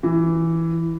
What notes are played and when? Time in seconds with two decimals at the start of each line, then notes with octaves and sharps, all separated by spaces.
0.03 E3